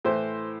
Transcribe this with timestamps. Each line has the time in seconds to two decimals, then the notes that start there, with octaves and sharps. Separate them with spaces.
0.05 A2 E3 C5